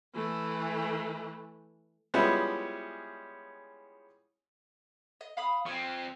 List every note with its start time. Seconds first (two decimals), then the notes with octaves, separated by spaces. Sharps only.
0.15 E3 A3
2.14 F3 G3 G#3 B3 C#4 E4
5.21 D#5
5.37 F5 B5 D#6
5.66 F3 C4 G#5 C#6